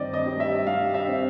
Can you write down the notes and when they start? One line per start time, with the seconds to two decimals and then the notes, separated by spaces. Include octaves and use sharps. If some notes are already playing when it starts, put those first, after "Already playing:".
Already playing: G2 D#3 C4 D5 D#5
0.13 D#5
0.26 G3
0.40 E5
0.67 G3 F5
0.94 E5
1.08 C4